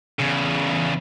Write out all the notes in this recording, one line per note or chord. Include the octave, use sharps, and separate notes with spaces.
E2 C#3